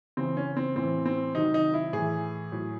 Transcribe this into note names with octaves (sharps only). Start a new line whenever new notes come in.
C#3 E3 C4
C#4
C4
A2 E3 C4
C4
C3 D#3 F#3 D#4
D#4
E4
A2 E3 G#4
A2 F#3